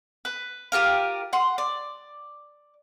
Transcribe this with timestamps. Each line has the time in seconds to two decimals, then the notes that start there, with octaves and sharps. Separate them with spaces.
0.25 B4
0.72 F4 G4 A#4 F5
1.33 F#5 C6
1.58 D5